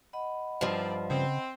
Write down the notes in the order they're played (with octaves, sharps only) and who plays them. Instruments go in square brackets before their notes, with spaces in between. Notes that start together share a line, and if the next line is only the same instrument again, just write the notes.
[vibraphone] D#5 F#5 B5
[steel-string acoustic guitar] G2 F3 [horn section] C4 D#4 D5
[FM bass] C#3 [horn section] C4